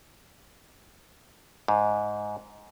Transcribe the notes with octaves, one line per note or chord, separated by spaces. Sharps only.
G#2